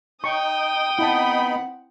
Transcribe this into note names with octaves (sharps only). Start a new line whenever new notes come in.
D#4 G5 C#6 D#6
B3 C4 D#4 E4 F#5 A5 B5